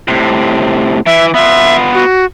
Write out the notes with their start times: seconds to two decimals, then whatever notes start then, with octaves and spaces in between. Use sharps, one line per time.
0.08 A2 C3
1.06 E3 E5
1.34 B3 F4 E5
1.94 F#4